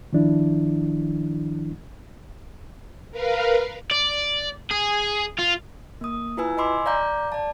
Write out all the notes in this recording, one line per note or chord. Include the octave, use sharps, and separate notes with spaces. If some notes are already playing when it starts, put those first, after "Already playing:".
D#3 F3 D4 E4
A#4 B4 F5
D5
G#4
F4
A#3 D#6
E4 F4 B4 G#5 E6
D#5 G#5 B5 C6 D6 E6
D5 F5 A#5 D6 G6
D5 A5